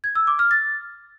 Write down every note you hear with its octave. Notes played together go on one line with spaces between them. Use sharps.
G#6
E6
D6
F6
A6